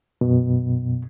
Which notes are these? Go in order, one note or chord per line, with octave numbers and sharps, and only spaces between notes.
F#2 B2